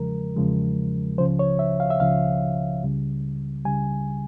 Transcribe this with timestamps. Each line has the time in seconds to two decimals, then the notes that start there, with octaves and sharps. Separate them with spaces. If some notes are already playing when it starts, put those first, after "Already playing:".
Already playing: E2 C#3 F3 G#3 A#4
0.37 E2 C#3 F3 G#3
1.18 C#2 C#3 F3 C5
1.39 C#5
1.59 E5
1.80 F5
1.90 E5
2.00 C#2 C#3 F3 F5
2.83 C#2 C#3 G3
3.65 C#2 C#3 G3 G#5